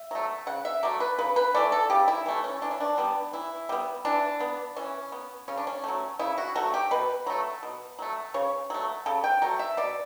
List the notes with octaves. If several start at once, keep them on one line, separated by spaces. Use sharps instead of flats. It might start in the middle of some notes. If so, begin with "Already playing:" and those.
Already playing: E5
F#3 A3
C#3 F#5
E5
F#3 A3 D5
B4
C#3 B4
B4
E3 A3 D5
A4
C#3 G4
E4
E3 A3
C#4
E3 D4
C#4
D4
G3 B3
E3 E4
G3 B3
E3 D4
B3
E3 C#4
B3
C#3 C#4
D4
C#4
F#3 A3
C#3 E4
F#4
F#3 A3 F#4
G4
B2 B4
F#3 A3
B2
F#3 A3
C#3 C#5
F#3 A3
C#3 A4
G5
F#3 A3
E5
B2 D5